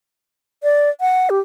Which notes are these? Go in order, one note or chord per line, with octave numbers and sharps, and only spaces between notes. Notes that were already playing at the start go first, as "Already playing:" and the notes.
D5
F#5
G4